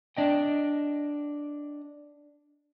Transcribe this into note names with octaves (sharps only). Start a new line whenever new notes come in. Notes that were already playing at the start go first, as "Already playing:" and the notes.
D4 D#5 G5